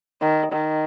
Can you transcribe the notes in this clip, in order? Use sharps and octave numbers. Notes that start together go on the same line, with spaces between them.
D#3
D#3